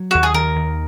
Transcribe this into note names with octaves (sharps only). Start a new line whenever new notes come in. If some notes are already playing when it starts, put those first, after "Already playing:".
Already playing: F#3
D#2 F#4
G#4
D#3 A#4
D#2